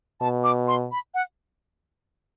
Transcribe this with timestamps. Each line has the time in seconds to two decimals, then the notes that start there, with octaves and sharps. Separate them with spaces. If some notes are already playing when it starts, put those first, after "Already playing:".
0.20 B2 A5
0.44 D6
0.68 C6
0.92 B5
1.14 F#5